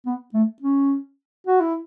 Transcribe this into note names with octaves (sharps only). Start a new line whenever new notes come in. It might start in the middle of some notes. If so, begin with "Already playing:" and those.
B3
A3
C#4
F#4
E4